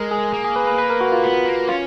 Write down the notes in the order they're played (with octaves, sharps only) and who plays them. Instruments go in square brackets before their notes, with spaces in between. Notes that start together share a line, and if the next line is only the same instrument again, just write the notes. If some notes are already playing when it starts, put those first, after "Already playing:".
Already playing: [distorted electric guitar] G#3 [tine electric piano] A#4
[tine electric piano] G#4
[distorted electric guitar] A#3
[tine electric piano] G#4
B4
B4
B4
A#4
F#4
F4
[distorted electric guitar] B3
A#3
[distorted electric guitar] C#4 [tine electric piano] F4